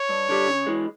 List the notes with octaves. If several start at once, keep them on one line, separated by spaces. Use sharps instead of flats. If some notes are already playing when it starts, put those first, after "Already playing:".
Already playing: C#5
G2
D3 G3
C#3
E3 G#3